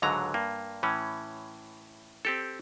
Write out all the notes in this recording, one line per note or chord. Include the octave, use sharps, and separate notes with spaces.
C#2 G#2 D3 F#3 A#5
G2 A#3
A2 E3 C#4
C4 G4 A4